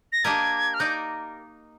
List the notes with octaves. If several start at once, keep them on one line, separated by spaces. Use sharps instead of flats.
A#6
A#3 D4 G4 A#4 D#5 G#6
F6
A#3 D#4 A#4 D5 G6